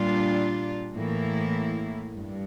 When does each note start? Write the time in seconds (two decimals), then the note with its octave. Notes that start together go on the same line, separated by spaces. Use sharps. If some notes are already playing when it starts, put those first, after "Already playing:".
Already playing: A#2 G3 D4 F4
0.94 A2 E3 A#3 E4
2.16 G2